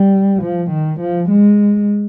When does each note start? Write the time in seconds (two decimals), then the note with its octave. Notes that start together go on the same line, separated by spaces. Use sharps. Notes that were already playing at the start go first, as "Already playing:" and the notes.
Already playing: G3
0.43 F3
0.71 D#3
1.00 F3
1.30 G#3